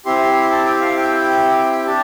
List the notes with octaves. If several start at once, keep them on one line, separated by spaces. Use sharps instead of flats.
C4 E4 G4 C6
A5
G5
F5
G5
G5
D4 G4 A5